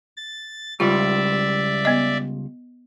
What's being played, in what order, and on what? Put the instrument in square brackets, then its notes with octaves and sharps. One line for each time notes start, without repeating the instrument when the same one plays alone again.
[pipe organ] A6
[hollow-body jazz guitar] C#2 G3 [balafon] F4 [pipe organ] D5 E5
[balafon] B3 D#5